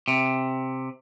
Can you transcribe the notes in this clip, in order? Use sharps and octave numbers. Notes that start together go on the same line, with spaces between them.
C3